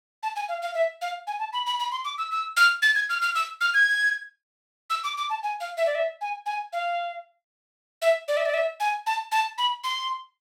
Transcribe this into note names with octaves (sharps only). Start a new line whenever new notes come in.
A5
G#5
F5
F5
E5
F5
G#5
A5
B5
B5
B5
C6
D6
E6
E6
F6
A6
G#6
F6
F6
E6
F6
G#6
E6
D6
D6
A5
G#5
F5
E5
D5
E5
G#5
G#5
F5
E5
D5
E5
D5
E5
G#5
A5
A5
B5
C6